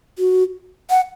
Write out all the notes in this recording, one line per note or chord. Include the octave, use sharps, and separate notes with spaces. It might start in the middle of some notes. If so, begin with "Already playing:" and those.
F#4
F#5